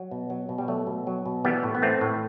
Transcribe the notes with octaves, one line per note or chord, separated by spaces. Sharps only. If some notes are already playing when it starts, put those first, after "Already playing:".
Already playing: F#3
B2
F#3
B2
G3
F#3 A3
B2
F#3
B2
E3 G3 B3
A2
B3
E3 A3 C4
A2